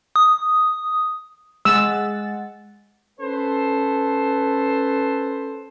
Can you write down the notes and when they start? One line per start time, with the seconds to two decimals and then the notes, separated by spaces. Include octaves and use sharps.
0.16 D#6
1.65 G#3 F#5 E6 A6
3.19 C#4 A4 B4 C5